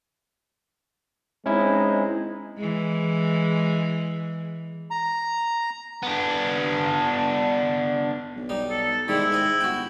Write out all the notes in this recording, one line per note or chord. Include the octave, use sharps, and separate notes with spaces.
G#3 C4 C#4 D#4 E4
E3 G#3
A#5
B3 D4
B1
G3 D#4
A4
G#2 D#3 G3 G#3 E4
C4 D#5
G1 F#4 G5